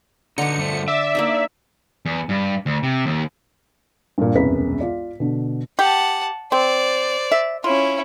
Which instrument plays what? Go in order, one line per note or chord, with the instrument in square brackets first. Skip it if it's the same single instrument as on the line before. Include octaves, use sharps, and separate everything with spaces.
[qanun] D3 C#6 [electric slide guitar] B3 D#4 [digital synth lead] C#7
[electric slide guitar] G2 F3 A3
[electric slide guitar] D5 [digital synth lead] E5
[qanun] A#3 D4 D#4
[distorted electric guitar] E2
G2
D2
C3
D#2
[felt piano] G2 A#2
E1 C2 F#2 B4 B6
F4 D5
B2 D3
[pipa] G4 [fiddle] F#5 A5
[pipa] C4 [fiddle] C5 D5
[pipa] E5
[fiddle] C#4 E4 [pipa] F4